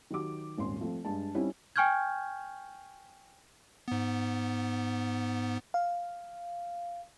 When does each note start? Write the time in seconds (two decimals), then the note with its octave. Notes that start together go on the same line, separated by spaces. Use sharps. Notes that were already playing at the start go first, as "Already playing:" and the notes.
0.10 D#3 F#3 G4 D6
0.58 D#1 G#1 C#4 C6
0.81 F3 A3 C4
1.05 G2 G#3 D4 A5
1.34 G3 C4 C#4 D#4 E4 C#5
1.76 G5 G#5 C#6 F6 G6 G#6
3.88 G#2 B3
5.74 F5